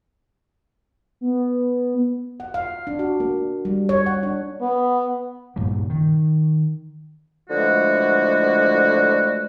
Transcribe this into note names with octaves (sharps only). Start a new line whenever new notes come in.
B3
F#5
F5
D4
F#4
A#3
G3
C#5
F#5
D4
B3
G2 A#2 C#3 G3
D#3
D3 E3 F3 G#3 A3 F#4